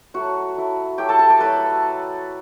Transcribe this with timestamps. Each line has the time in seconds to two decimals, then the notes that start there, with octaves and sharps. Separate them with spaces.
0.14 F#3 A3 E4 F#4 F#5
0.56 F#3 A3 E4
0.98 F#3 A3 E4 G4 G5
1.09 A4 A5
1.19 A4 A5
1.30 G4 G5
1.40 F#3 A3 E4 B4 B5